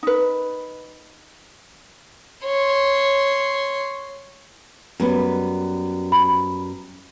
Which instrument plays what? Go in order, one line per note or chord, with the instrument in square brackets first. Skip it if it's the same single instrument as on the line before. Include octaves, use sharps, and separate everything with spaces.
[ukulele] D#4 B4
[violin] C#5 C6
[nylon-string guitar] F#2 G3 B3
[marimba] B5